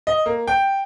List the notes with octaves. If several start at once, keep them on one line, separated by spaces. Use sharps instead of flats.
D#5
A#3
G5